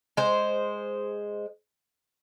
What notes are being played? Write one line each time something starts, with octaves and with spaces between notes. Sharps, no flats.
G#3 C5